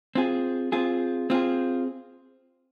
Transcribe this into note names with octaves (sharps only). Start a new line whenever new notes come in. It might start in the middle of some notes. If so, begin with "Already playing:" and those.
C4 F4 G#4
C4 F4 G#4
C4 F4 G#4